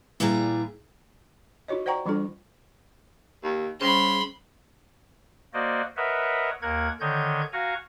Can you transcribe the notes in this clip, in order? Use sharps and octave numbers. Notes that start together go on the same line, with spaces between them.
A#2 E3 G3 G#4 A#5
D#4 F4 F#4 C#5 D#5
C5 D5 F#5 G5 A#5 C#6
E3 G3 D4 F4 A4
D#2
C#3 G3 C#4 C5 B5 C6
A#3 F#4 C5 D5 D#5
A#4 B4 C#5 D#5 E5 F#5
D#2 A#3 A#4 F#5 G#6
D3 D#3 C#5 D#5 G6 G#6
F#4 F5 G#5 A#5 C#6